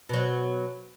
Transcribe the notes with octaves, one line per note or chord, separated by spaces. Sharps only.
B2 F#3